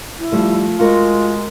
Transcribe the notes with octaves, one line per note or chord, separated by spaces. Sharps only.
E4
F3 G3 A3
G#3 F4 F#4 A#4